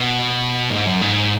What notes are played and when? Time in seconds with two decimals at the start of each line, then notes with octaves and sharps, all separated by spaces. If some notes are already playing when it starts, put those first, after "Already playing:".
Already playing: B2
0.70 G#2
0.86 F#2
1.01 G#2